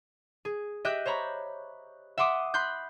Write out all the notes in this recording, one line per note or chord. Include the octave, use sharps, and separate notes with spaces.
G#4
G4 D#5 E5 F#6 G6
C5 C#5 A#5 B5 C#6
E5 F#5 C6 D6 D#6
B5 C6 F#6 G6